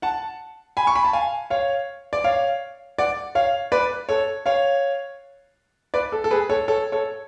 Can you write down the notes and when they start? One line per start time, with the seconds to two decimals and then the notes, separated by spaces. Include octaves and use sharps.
0.02 F#5 A5
0.77 G#5 B5
0.87 C#6
0.95 B5
1.05 A5
1.13 F5 G#5
1.50 C#5 F5
2.13 D5
2.24 C#5 F5
2.98 D5 F#5
3.35 C#5 F5
3.72 B4 D5
4.09 A4 C#5
4.46 C#5 F5
5.94 B4 D5
6.12 A4
6.24 A4
6.31 G#4 B4
6.49 A4 C#5
6.68 A4 C#5
6.92 A4 C#5